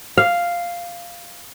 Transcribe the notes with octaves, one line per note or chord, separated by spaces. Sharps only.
F5